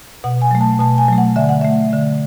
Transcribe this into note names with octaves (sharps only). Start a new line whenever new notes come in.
B2 F#5
G#5
F#3 A3
A5
B2 A5
G#5
F#3 A3
F#5
D3 E5
F#5
A3 E5
D3